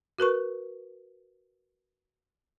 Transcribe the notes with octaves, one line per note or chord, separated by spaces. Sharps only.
F#4 A#4 B4 C#6